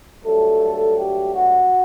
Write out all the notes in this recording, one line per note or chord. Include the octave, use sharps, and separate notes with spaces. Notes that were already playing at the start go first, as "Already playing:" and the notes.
G2 F#3 A3 A4
G4
F#4